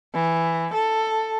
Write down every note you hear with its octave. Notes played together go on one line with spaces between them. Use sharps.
E3
A4